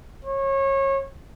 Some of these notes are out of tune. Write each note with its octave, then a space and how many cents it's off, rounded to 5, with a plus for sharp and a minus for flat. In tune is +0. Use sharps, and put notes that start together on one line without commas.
C#5 -25